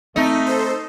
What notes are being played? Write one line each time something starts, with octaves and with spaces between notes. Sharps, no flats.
A3 C4 D#4
A4 C5